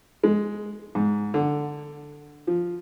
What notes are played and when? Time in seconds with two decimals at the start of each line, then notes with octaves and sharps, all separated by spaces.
0.24 G#3
0.95 G#2
1.34 D3
2.47 F3